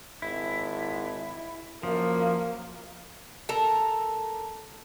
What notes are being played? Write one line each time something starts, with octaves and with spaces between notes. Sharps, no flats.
G#1 E4
F#2 F3 A#3
A4 A#4